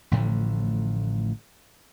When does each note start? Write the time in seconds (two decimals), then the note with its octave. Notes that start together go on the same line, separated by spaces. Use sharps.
0.11 A1 A2 D3 F3